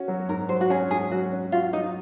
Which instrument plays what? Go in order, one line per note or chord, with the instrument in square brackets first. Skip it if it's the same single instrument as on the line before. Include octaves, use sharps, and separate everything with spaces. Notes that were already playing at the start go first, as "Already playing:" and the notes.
Already playing: [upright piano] C#4 F#4
F#3
[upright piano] G#2 [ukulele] A#4
[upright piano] F#3 [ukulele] C5
[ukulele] F#4
[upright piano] C#4 [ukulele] G#4
[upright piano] G#2 [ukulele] G#4
[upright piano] F#3 [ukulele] F#4
[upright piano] C#4
[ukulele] F4 [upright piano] F#4
[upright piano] F#3 [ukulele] D#4